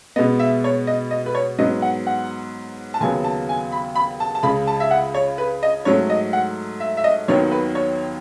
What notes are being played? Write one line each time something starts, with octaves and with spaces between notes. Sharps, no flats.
B2 G#3 B3 D#5
E5
C#5
D#5
D#5
B4
C#5
G#2 F#3 B3 D#5
F#5
F#5
A5
D#2 C#3 F#3 B3 G#5
A5
G#5
B5
B5
A5
A5
C#2 C#3 G#3 B5
A5
E5
F#5
C#5
B4
D#5
G#2 F#3 A3 C#5
D#5
F#5
E5
E5
D#5
D#2 D#3 F#3 B3 C#5
B4
C#5